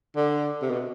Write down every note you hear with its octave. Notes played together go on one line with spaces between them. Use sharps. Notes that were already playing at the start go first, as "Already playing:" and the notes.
D3
C3
B2